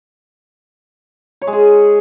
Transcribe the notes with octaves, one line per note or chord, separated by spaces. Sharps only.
C#5
G#3
G#4